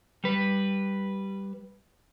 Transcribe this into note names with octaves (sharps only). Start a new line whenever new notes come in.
G3 B4